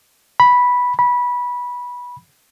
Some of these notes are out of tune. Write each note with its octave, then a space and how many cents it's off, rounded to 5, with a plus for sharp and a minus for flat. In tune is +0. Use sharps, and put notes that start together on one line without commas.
B5 -5
B5 -15